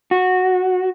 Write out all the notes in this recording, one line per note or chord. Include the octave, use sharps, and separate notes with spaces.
F#4